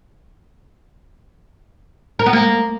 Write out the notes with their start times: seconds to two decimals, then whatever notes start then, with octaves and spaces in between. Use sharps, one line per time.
2.19 A#4
2.26 B3
2.33 A#3